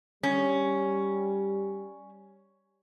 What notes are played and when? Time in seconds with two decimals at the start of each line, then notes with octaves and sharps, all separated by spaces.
0.23 G3 C#4